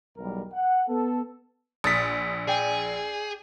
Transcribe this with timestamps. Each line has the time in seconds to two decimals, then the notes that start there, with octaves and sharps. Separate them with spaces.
0.17 B1 E2 G3 A#4
0.53 F#5
0.88 B3 A4
1.84 A#1 D#6 A6 B6
2.48 G#4 D5 G5